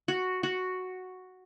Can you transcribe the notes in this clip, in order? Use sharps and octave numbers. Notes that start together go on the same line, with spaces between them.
F#4
F#4